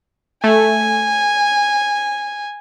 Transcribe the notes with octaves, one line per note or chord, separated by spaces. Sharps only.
A3 G#5